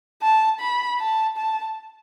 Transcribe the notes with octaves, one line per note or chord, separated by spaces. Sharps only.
A5
B5
A5
A5